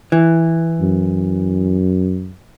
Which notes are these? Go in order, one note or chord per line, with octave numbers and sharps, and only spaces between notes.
E3
F#2